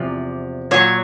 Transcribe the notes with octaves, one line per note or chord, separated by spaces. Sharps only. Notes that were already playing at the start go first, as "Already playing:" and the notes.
Already playing: E2 C3 F3 D5
A#2 F#3 C#5